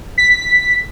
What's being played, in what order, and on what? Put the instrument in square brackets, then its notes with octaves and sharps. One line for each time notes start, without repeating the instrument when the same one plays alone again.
[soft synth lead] B6